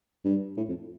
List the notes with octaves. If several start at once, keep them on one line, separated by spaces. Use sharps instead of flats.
G2
A2
F2